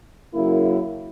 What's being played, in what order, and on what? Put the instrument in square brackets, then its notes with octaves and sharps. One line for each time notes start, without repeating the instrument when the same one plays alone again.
[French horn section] F#2 C#3 F#3 A#3 E4